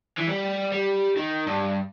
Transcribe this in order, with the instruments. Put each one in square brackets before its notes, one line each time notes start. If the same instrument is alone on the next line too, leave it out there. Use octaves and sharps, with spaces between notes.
[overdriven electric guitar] E3
G3
G3
D#3
G2